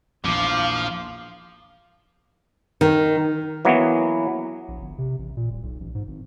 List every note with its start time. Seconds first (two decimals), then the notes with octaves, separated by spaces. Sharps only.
0.24 A#1 E2 F3 F5 D6
2.81 D#3
3.65 E3 F#3 A#3 B3
4.68 A#1
4.82 G1
4.98 C3
5.19 A1
5.37 A#2
5.50 D#1
5.63 B1
5.80 A1
5.95 G#2
6.07 G#1